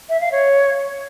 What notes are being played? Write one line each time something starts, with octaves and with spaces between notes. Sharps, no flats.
E5
F5
C#5